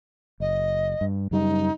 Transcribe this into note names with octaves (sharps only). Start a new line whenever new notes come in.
F#1 D#5
G2
F#2 C#3 G3 D#4